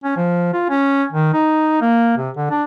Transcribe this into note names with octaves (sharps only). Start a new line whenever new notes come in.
C#4
F3
F4
C#4
D#3
D#4
A#3
C3
D3
D4